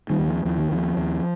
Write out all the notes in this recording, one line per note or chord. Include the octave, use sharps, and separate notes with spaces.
D#3 G3
D#2
F3
D#2 F3
D#3
D#2 F3
D#2